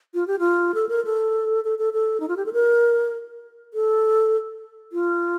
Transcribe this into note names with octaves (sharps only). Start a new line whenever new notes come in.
F4
G4
F4
A4
A#4
A4
A4
A4
A4
D#4
F4
G4
A4
A#4
A4
F4